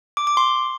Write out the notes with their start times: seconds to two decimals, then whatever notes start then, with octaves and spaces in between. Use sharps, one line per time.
0.17 D6
0.27 D6
0.37 C6